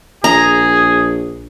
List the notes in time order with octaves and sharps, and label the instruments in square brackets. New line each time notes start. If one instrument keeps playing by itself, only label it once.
[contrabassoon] A#1 [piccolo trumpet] G#4 [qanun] A#5